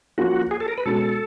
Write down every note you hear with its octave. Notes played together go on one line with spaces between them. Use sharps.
F3 A#3 C#4 F4 F#4
G#4
A4
A#4
B4
B2 G#3 C#4 A4